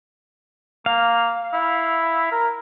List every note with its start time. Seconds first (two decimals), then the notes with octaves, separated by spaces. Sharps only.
0.86 A#3 F5
1.53 E4
2.32 A#4